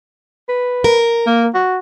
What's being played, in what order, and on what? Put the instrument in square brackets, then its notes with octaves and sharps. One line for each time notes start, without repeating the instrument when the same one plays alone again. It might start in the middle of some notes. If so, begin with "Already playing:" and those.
[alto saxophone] B4
[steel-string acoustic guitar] A#4
[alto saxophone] A#3
F#4